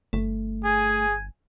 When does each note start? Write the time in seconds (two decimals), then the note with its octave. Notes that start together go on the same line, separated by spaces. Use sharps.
0.13 G1 A3
0.64 G#4 G#5